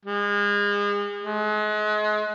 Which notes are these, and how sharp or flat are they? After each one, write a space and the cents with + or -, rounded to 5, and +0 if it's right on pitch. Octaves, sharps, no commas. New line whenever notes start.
G#3 -35
G#3 +35